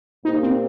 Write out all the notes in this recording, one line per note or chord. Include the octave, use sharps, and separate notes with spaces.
A#2 A#3 D#4 G4 C5
C4